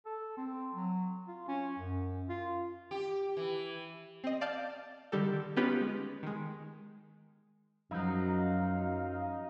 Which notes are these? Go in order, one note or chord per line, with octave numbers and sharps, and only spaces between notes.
A4
C4
F#3
F4
C#4
F#2
F4
G4
E3
C4 D#5
D5 F5 A5 F6 G6
D3 D#3 G3 G4 A4
B3 C#4 D#4 F4 G4 B4
G#3
D#3 G#3
F#2 F3 F#3 D#4 F5